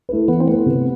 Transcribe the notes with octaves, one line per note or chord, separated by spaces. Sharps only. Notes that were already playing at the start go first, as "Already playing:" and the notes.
A3 E4 B4
E3 B3
C4
A3 B3 E4 B4
C3